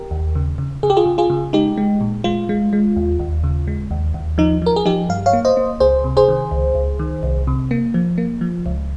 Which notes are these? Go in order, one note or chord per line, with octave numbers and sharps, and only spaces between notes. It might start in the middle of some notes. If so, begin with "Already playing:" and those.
Already playing: G4 A#4
D#2
C#3
C#3
C#3 G#4
G4
F4 G#4
C#3
F4 G#4
C#3
G#3 D#4 G4
G#3
A#2
G#3 F4
G#3
G#3
D#2
D#2
C#3
G#3
D#2
D#2
F3 D#4
F3 A#4
G#4
F3 D#4 G4
G2 F5
C#5 F5
A#3
C5 D#5
A#3
C#2 G#4 C5
C3
G#4 C5
D#3
C#2
C#2
D#3
C2
C3
A#3
F3
A#3
F3
C#2